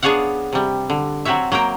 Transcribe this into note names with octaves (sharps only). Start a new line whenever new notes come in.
B3 D4 G#4 C#5 F5 F#5
C3 G3
D3
F#3 C4 F#4 C#5 E5
F#3 A#3 A#4 G5